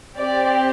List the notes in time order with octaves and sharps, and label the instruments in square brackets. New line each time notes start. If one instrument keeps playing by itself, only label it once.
[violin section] C4 G4 D5